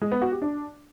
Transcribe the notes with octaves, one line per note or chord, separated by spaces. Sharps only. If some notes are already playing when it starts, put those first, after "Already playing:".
G#3
B3
F#4
G4
D4